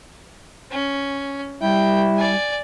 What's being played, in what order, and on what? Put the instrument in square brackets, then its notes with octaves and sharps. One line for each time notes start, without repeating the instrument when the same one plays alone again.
[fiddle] C#4
[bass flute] G3 [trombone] E4 [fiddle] G5
[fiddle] D5 G#5